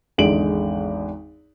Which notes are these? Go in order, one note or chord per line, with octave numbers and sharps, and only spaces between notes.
G#1 E2 D3 G#3 D7 F#7